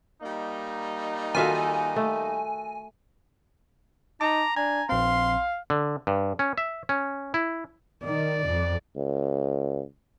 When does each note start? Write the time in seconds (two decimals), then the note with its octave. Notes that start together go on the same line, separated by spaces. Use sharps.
0.22 G3 A#3 D#4
1.35 D#3 F4 F#4 A4 E5 F5 G#5
1.96 A3
4.21 D#4 A5 A#5 D6
4.56 D4 G#5 A#5
4.89 A#1 C4 F5 C6
5.70 D3
6.07 G2
6.39 C#4
6.58 E5
6.89 C#4
7.34 E4
8.04 D#3 D5
8.46 F2
8.96 C#2